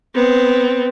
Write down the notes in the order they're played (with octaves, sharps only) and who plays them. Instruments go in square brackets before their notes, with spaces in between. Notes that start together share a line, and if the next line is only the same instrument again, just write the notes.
[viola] B3 C4